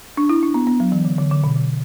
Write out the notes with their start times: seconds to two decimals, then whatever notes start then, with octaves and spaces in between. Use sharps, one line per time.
0.17 D4
0.29 E4
0.43 D4
0.54 B3
0.67 B3
0.80 F#3
0.92 E3
1.05 D3
1.18 D3
1.31 D3
1.44 B2
1.56 D3